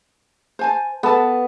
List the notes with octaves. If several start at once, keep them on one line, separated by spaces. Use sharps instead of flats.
C5 G#5 A5
B3 A4 A5